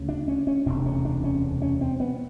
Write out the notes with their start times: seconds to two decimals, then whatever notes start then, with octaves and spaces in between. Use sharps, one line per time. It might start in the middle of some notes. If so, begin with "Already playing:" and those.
Already playing: D2 C#3
0.09 D4
0.28 C#4
0.47 C#4
0.66 E1 D2 C3 D4
0.86 C#4
1.05 D4
1.24 C#4
1.62 C#4
1.81 C4
2.00 B3